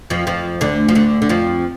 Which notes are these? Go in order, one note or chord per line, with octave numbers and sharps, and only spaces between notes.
F2 F3
F2 F3
D2 D3
F3
D2 D3
D3
F2 F3